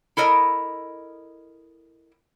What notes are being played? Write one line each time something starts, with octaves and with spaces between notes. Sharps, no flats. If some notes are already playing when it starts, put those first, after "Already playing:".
E4 A4 A#4 D#5